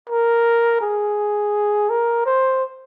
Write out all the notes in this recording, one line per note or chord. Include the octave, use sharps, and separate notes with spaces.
A#4
G#4
A#4
C5